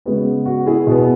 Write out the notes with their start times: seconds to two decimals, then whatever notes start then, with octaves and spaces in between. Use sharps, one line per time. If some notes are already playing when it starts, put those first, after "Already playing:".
0.06 C#3 G#3 B3 F#4
0.46 F#4
0.66 E4 G#4
0.87 B2 B3